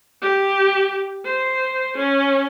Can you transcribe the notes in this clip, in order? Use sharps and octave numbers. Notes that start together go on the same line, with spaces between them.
G4
C5
C#4